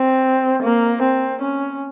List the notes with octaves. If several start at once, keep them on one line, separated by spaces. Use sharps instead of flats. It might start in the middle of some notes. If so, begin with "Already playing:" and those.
Already playing: C4
A#3
C4
C#4